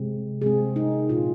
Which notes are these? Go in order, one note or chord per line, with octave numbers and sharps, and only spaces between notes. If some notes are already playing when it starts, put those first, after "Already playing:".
Already playing: C3 G#3 C4
C3 G#3 C4 G#4
D#4
A#2 A#3 D#4 F4